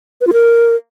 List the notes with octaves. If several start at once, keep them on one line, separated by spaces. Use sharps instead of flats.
B4
F4
A#4